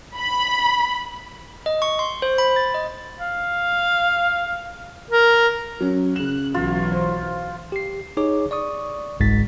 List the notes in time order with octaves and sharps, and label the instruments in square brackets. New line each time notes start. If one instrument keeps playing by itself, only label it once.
[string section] B5
[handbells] D#5
C#6
C6
C5
B5
A6
D#5
[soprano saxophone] F5
A#4
[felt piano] F#3 C#4
[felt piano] C#3 E7 [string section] F#6
[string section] B1 E3 F#3 [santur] F4
[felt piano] C5
[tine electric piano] G4 C7
D#4 G#4 C#5 D6
D5 C#6 D#6
G1 C2 G#2 G#3 A6 B6